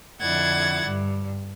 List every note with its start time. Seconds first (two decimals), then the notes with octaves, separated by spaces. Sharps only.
0.21 F2 D3 E4 F#5 G#6 A6
0.86 G2